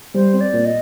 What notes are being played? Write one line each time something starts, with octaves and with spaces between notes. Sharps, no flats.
G3 C5
C4
D5
A#2
D#5